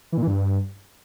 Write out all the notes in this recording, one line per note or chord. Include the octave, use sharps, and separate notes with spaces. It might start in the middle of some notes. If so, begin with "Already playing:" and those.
E3
A#2
E3
G2